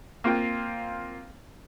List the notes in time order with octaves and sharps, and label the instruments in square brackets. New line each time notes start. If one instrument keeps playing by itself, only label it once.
[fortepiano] A#3 C4 F4 G5